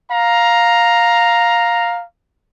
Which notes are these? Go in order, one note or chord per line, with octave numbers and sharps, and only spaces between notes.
F5 A#5